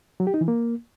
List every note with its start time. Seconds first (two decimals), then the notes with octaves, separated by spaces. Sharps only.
0.20 F#3
0.27 G4
0.34 D#4
0.41 E3
0.48 A#3